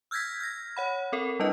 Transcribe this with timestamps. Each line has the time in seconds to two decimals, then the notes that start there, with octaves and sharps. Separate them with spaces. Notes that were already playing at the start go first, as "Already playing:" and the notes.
0.11 E6 F6 G6 G#6 A#6 B6
0.40 F6 A#6
0.77 C#5 F#5 B5
1.12 C4 A4 A#4
1.40 G3 D4 E4 B4 D#5